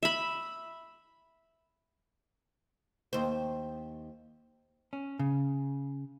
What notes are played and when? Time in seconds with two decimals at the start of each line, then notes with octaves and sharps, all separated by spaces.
0.03 E5 B5
3.13 D#2 C5
4.93 C#4
5.19 C#3